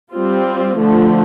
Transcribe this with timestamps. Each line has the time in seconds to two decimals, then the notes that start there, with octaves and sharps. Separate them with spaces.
0.13 G3 C4 F4
0.79 D3 F3 A3